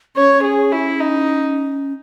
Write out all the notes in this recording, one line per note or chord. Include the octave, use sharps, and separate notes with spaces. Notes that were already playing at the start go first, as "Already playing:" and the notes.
C#4 C#5
G#4
E4
D#4